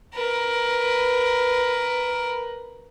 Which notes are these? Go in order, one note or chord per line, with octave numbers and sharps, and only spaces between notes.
A#4 B4